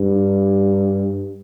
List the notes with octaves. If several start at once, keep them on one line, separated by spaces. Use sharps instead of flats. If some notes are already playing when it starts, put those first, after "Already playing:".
Already playing: G2